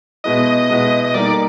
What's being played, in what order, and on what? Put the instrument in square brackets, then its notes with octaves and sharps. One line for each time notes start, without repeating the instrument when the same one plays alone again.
[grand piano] B2 G#3 B3 E4 [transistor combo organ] D#5
[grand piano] B2 G#3 B3 E4
[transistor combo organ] D#5
[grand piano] G3 A#3 D#4 [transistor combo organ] D5